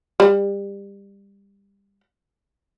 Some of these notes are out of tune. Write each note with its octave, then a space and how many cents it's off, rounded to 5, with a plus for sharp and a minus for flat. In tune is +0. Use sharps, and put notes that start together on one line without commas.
G3 +25